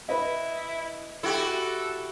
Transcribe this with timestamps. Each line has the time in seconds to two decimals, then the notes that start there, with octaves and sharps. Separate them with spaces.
0.09 E4 B4 D#5
1.23 E4 F#4 G4 A4